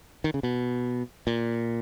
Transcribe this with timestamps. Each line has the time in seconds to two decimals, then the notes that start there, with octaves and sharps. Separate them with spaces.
0.24 D#3
0.34 C#3
0.43 B2
1.27 A#2